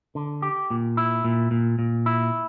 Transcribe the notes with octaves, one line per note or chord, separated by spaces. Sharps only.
D3
G4
A#2
E4
A#2
A#2
A#2
E4